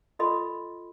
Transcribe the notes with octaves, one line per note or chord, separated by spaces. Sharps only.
F4 A4 D#5 B5 C6